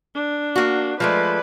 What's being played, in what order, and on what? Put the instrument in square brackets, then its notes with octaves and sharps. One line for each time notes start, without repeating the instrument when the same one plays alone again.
[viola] D4
[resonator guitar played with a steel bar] A#3 F#4
[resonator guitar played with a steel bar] F3 G#3 A3 [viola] B4 D5